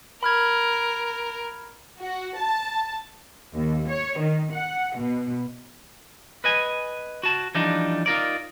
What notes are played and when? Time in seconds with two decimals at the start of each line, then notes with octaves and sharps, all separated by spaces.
0.23 A#4 B5 F6 G#6
1.99 F#4
2.37 A5
3.54 D#2
3.87 C#5
4.18 D#3
4.51 F#5
4.97 B2
6.44 B4 D#5 G#5
7.23 F#4 A5
7.55 E3 F3 G3 D4 D#4
8.06 D#4 F4 A#4 D5